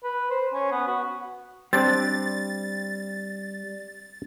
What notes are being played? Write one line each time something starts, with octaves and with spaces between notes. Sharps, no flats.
B4
C5
C#4
B3
F#4
G3 C4 D4 D5 A6